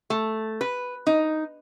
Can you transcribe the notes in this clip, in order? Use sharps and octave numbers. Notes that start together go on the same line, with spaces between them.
A3
B4
D#4